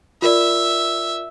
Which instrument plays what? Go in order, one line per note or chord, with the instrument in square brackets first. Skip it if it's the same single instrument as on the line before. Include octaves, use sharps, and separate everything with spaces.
[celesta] F4 A#4 D5 [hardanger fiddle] E5